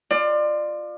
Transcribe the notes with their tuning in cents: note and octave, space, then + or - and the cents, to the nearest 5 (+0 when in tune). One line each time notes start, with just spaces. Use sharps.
F4 +0 D5 +30